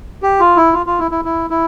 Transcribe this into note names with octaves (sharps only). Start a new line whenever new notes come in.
G4
F4
E4
F4
F4
E4
E4
E4
E4